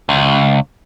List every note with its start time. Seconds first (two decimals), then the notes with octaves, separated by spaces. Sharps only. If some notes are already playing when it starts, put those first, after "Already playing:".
0.09 C#2